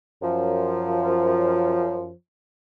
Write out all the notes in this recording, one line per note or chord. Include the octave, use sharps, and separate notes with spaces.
F#2 F3